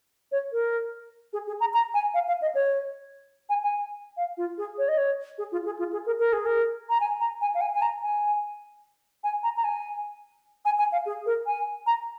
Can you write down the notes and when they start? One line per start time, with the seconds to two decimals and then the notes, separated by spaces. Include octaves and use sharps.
0.32 C#5
0.52 A#4
1.33 G#4
1.47 G#4
1.60 A#5
1.74 A#5
1.94 G#5
2.14 F5
2.28 F5
2.42 D#5
2.55 C#5
3.49 G#5
3.63 G#5
4.17 F5
4.37 F4
4.58 G#4
4.78 C#5
4.88 D#5
4.98 C#5
5.38 G#4
5.52 F4
5.66 G#4
5.79 F4
5.93 G#4
6.06 A#4
6.19 A#4
6.33 G#4
6.46 A#4
6.89 A#5
7.00 G#5
7.20 A#5
7.41 G#5
7.55 F5
7.61 G#5
7.74 G#5
7.82 A#5
8.02 G#5
9.24 G#5
9.43 A#5
9.57 A#5
9.64 G#5
10.65 G#5
10.79 G#5
10.92 F5
11.06 G#4
11.26 A#4
11.46 G#5
11.87 A#5